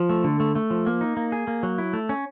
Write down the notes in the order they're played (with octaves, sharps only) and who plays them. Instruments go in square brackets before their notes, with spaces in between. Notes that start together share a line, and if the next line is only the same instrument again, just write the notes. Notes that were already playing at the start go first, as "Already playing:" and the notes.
Already playing: [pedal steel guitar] F3
A3
D3
A3
A3
F3
A#3
D#4
A#3
G#4
A#3
F#3
E4
A3
C#4